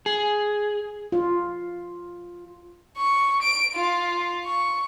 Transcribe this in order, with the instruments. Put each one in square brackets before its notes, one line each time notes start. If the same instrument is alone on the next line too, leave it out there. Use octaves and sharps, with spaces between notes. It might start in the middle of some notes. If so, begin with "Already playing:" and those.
[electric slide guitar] G#4
[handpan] F4
[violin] C#6
D7
F4
C#6